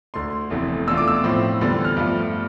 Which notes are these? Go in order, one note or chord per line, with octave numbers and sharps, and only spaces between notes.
D2 D3 A3 C6
F1 E2 C3 E3 A3
E2 B2 A3 D4 F4 E6
D6
E6
A2 F3 C4 E4
E2 D3 G3 B3
F6
G2 F3 A3